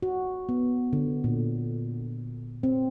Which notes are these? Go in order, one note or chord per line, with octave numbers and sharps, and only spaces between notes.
F#4
B3
D3
A#2
C4